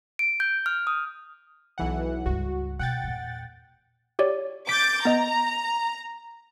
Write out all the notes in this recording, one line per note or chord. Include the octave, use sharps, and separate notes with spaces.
D7
G6
F6
D#6
B1 E3 F#5
C#2 G2 F#4
B2 D3 F#5 G5 A6
E2 A#2
G4 C#5 D5
D6 G6 A6 B6
B3 D#5 A#5